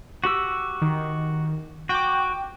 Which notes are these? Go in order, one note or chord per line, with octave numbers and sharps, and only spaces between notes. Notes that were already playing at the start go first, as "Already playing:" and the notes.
F#4 G4 E6
D#3
F#4 G5 D6